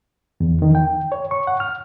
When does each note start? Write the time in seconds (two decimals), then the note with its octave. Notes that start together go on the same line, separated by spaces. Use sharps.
0.40 E2
0.62 D#3
0.75 G5
1.12 C#5
1.31 C#6
1.47 F#5
1.60 F6